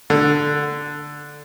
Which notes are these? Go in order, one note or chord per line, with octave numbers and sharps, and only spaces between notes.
D3